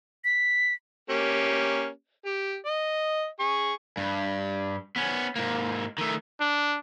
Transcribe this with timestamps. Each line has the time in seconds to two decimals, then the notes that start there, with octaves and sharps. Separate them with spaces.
0.24 B6
1.10 A#3 C#4 G4
2.25 G4
2.66 D#5
3.40 G#4 C#6
3.97 G2
4.96 B3 C#4
5.36 G#2 A#3
5.98 D#3 A3
6.40 D4